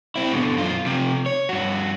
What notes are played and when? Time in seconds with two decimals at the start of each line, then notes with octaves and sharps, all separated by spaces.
0.16 C4 E4
0.34 B2 D3
0.57 F#2 F4
0.86 C3 F3
1.26 C#5
1.49 G2 F#4